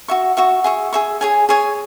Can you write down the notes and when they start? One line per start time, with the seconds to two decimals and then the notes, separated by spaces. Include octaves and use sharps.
0.08 F#4 E5 C#6
0.37 F#4 E5 C#6
0.64 G#4 E5 C#6
0.93 G#4 E5 C#6
1.21 G#4 C#5 G#5
1.49 G#4 C#5 G#5